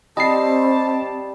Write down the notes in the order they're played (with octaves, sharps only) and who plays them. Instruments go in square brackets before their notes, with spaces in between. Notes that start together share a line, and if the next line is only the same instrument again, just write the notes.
[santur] G3 [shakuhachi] C4 [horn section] G4 A5 [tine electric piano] D#5 C7